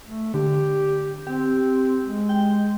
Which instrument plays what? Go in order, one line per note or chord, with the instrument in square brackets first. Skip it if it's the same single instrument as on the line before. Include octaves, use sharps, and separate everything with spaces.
[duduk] A3
[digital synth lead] D3 [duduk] G4
[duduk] C4 [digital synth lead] G4
[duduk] G#3
[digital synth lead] G5